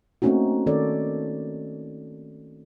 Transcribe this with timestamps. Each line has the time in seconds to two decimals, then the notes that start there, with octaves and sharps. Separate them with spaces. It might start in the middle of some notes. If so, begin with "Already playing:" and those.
0.22 A3 A#3 C4 C#4 D#4 F#4
0.66 D#3 C#4 A4 C#5 D5